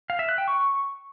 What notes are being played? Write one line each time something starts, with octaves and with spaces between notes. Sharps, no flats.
F5
E5
F#6
G5
C#6